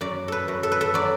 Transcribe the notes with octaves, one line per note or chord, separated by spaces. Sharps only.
F#2 D5
A4 B4
F#2
A4
B4
A4
F#3 D5